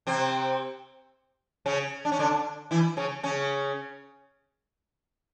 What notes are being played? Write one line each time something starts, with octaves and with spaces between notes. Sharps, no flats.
C3 C4
C#3 C#4
D4
C#4
D3 D4
E3 E4
C#3 C#4
C#3 C#4